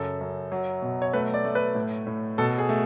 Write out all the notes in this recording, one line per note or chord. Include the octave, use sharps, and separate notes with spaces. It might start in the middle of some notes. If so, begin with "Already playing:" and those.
Already playing: F#2 C#3 A4
F#2
F#3
B2
C#5
A3 B4
D5
A3
B4
A2
A2
B2 A4
G#4
A3